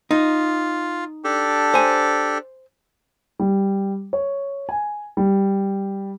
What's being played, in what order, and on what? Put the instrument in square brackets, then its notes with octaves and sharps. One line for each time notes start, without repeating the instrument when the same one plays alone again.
[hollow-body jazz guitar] D#4 [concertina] F4
[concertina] D4 G4 A4
[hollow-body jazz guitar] C5 G#5
[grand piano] G3
C#5
G#5
G3